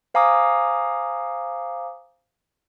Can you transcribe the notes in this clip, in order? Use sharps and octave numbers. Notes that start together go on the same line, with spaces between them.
C5 F5 G#5 A#5 D6 D#6